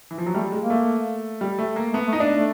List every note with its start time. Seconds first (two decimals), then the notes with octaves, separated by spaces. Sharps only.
0.11 E3
0.18 F3
0.26 F#3
0.35 G3 A3
0.52 G#3
0.61 A#3
0.70 A3
1.41 G3
1.59 A3
1.76 A#3
1.93 A3 B3
2.07 A3
2.13 D#4
2.20 D4
2.33 A3